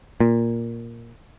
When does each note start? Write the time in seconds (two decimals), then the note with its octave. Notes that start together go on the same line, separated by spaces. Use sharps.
0.20 A#2